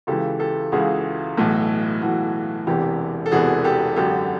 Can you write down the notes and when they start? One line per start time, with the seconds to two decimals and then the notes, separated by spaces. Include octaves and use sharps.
0.07 C#2 C#3 E3 G4 A4
0.40 G4 A4
0.72 C#2 C#3 E3 F#4 G#4
1.37 B1 A2 E3
2.02 B1 A2 E3 F#4
2.67 E1 E2 C3 E3 G4
3.26 A4
3.31 E1 E2 C3 E3 F#4 G#4
3.64 G4 A4
3.96 G#1 F#2 D3 G4 A4